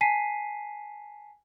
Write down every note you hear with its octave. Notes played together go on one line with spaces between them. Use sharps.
G#5 A5 B6 C7 D#7